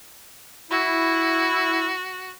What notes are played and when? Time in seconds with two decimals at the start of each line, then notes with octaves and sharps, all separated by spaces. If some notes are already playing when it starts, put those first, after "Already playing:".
0.71 E4 F#4